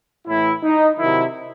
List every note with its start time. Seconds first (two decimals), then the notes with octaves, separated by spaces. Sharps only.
0.27 A2 E3 E4
0.63 D#4
0.99 C3 D#3 F#3 E4